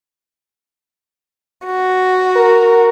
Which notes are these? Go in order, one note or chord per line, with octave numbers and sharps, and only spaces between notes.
F#4
A#4